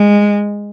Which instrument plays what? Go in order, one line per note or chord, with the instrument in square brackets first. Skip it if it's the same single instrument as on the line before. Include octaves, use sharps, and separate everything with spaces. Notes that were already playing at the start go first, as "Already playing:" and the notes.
Already playing: [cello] G#3